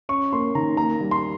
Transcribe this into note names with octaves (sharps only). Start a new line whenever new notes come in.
C#4 C#6
A#3 C6
D#3 A#5
A#3 A#5
G3
C6